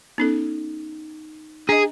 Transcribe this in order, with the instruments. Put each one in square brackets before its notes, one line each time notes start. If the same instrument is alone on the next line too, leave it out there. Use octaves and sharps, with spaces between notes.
[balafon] B3 C#4 A4 [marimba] D#4
[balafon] D4 D#5 [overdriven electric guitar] G#4